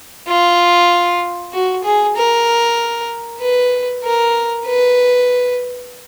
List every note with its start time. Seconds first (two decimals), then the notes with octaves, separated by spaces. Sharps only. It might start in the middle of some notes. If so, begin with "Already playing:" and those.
0.28 F4
1.53 F#4
1.84 G#4
2.16 A#4
3.40 B4
4.04 A#4
4.66 B4